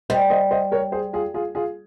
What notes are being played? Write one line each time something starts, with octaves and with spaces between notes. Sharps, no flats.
G3 C5 D#5
C5 D#5
C5 D#5
A#4 C#5
G#4 C5
F4 G#4
F4 G#4
F4 G#4